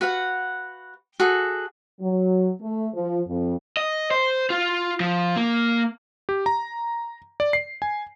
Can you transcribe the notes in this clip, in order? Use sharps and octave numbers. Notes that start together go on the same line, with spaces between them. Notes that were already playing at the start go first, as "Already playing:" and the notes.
F#4 B4 F5 F#5
F#4 G#4 A4
F#3
A3
F3
F2
D#5
C5
F4
F3
A#3
G4
A#5
D5
C7
G#5